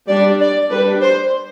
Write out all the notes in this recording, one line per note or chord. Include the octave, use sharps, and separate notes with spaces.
G3 D4 D5
D5
G3 D4 B4
C5